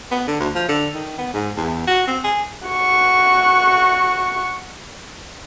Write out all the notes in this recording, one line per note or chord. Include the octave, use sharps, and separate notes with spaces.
B3
D3
D2
F3
D3
D#3
B3
G#2
E2
F#4
C4
G#4
F#4 C#6